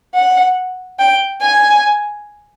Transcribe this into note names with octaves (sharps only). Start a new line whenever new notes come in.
F#5
G5
G#5